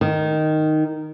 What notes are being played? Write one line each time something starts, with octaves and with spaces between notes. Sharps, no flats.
D#3